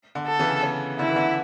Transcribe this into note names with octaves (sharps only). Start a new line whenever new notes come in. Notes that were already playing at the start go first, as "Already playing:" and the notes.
D3
A4
C#3 E3
C#3
D3 E4
E3
D3